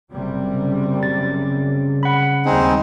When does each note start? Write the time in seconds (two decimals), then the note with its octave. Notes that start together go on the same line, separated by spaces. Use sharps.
0.12 F#1 C3 G3
0.49 C#3
1.03 C#3 A6
2.03 F#5 B5
2.46 D#2 G3 G#3 C4 D#4 G#4